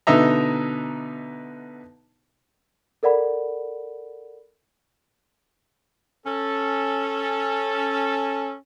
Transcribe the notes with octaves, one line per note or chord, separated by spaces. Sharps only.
B2 D3 B3 D#4 E5 A#5
A4 A#4 D5 F#5 B5
C#4 A4